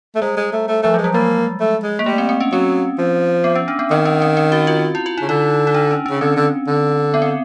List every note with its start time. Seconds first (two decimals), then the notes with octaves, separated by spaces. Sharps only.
0.15 A3
0.22 G3 G#3
0.37 G#3
0.53 A3
0.68 A3
0.83 F3 A3
0.94 F#3 G#3
1.04 G3
1.14 G#3 A#3
1.60 A3
1.83 G#3
1.99 A#3
2.06 G3 A3
2.18 C4
2.29 C4
2.40 C#4
2.52 F#3 C4
2.98 F3
3.44 B3
3.56 C#4
3.68 D4
3.79 B3
3.91 D#3 C4
4.06 C#4
4.22 C4
4.37 C4
4.52 F#4
4.67 F4
4.95 E4
5.06 F4
5.18 D#4
5.22 C#3
5.29 D3 D#4
5.67 D#4
5.74 D4
5.91 C#4
6.06 C#3 C#4
6.21 D3 C4
6.37 D3
6.67 D3
7.14 B3
7.22 C4